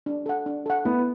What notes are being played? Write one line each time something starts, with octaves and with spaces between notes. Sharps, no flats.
D4
A4 F#5
D4
A4 F#5
B3 E4